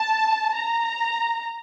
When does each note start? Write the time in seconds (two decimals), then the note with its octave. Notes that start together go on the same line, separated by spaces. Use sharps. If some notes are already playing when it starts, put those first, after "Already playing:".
Already playing: A5
0.55 A#5